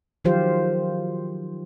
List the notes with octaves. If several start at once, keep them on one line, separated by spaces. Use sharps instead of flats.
D#3 F3 F#3 F4 G4 C5